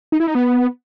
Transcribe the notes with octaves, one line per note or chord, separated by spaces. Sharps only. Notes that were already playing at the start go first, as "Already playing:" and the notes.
D#4
E4
D#4
B3